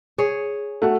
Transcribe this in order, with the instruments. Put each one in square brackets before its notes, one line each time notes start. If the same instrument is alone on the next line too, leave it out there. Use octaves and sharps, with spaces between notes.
[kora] G#4 C#5
[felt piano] A3 F#4 F#5